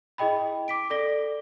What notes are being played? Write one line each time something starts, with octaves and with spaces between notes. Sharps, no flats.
E4 G#4 D#5 G5 B5
D6 B6 D7
A4 D5 A#6 G7